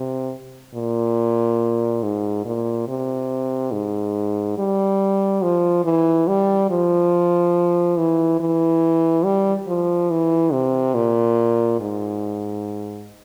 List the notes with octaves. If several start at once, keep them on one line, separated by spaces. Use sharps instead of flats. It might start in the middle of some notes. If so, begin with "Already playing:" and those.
Already playing: C3
A#2
G#2
A#2
C3
G#2
G3
F3
E3
G3
F3
E3
E3
G3
F3
E3
C3
A#2
G#2